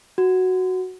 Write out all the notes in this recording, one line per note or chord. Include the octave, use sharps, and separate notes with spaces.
F#4